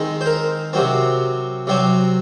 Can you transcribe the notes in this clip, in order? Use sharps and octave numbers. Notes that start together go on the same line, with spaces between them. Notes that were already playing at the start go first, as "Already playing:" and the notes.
Already playing: D#3 G#3 C4 D#4
C5
A#4
C3 F#3 C4
C3 F#3 C4